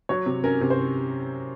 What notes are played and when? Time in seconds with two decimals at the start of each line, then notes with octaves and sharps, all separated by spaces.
0.09 F#3 C#5
0.26 C3
0.44 C#4 A#4
0.61 C3
0.70 C5